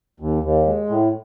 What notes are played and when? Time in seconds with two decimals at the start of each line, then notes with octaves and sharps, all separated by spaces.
0.20 D#2
0.43 D#2
0.67 G#3
0.89 A2